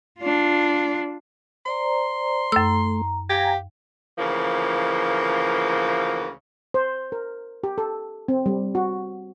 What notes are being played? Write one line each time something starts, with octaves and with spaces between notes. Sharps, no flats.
D4 F4
C5 D5 A#5 C6
F#2 A3 A#5 E6
G4 F5 G5 G#5 A#5
D2 C#3 E3 F3 A#3
C5
A#4
G4
A4
C4
G3
F#4